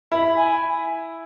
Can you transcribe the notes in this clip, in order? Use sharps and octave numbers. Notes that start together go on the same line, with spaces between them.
E4 B5
G#5